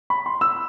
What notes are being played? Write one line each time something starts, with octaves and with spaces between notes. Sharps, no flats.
B5
C6
E6